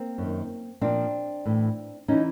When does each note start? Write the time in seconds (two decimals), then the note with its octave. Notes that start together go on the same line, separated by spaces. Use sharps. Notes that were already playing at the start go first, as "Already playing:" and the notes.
Already playing: A#3 C4
0.18 F#2 D#3
0.81 A#2 F3 C4 D4
1.45 A2 E3
2.08 E3 C#4 D#4